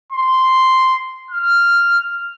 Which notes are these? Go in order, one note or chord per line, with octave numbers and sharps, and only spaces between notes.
C6
F6